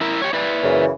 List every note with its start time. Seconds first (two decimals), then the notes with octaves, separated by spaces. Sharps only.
0.01 E4 A#4 E5
0.22 G4 C#5
0.33 E4 B4 D5
0.64 F#2 C#3 E3